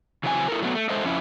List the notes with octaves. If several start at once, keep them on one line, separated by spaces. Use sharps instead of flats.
C#3 E3 F#3 C4 D#5 G#5
E4 A4 A#4
F#3 A3 B3
A3
G#3 A4 C5 D#5 E5
F2 C#4 E4